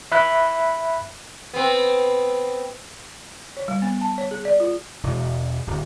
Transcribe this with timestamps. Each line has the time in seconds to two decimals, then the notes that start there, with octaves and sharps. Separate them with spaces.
0.12 E5 B5 F#6
1.53 B3 C4
3.57 C#5
3.68 G3
3.82 B3
4.01 A5
4.18 C#5
4.31 G#4
4.45 D5
4.60 F4
5.03 E1
5.67 D1